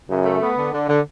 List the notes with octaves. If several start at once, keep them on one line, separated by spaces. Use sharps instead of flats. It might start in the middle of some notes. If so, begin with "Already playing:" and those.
F#2 C#3
A3
B3
D3
D3
D3